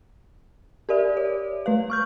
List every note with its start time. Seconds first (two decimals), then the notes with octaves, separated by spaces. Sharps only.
0.89 G4 A#4 D5 E5
1.17 C#5
1.66 A3 B4 F5
1.90 C#6 F6 G6